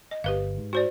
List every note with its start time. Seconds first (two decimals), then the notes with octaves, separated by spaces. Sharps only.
0.11 D#5
0.24 G1 G4 B4 F5
0.58 G#2
0.73 F#4 C5 D5